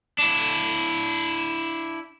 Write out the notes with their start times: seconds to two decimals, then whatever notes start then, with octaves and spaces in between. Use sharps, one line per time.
0.18 D4 E4